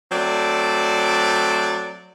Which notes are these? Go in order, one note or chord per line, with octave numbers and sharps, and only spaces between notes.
F#3 A3 C4 D5